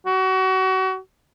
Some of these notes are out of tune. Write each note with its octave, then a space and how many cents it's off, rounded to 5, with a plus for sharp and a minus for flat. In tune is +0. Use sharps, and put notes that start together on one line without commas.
F#4 +30